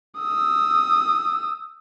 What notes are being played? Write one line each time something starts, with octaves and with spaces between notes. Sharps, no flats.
D#6 E6